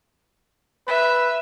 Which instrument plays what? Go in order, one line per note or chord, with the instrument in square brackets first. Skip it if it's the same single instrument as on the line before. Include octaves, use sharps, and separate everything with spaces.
[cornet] B4 [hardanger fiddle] E5